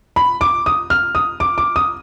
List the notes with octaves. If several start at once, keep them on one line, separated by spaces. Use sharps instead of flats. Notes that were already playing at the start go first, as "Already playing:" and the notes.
B5
D6
D#6
F6
D#6
D6
D6
D#6